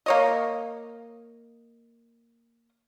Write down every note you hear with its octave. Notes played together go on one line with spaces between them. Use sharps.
A#3 C#5 D#5